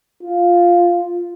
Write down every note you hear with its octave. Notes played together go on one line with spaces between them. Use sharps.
F4